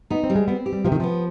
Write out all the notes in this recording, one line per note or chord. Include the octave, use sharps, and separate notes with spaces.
B3 D#4
C4
G3
G#3
B3 C4
G4
G3
C3 F3
D#3
F3 B3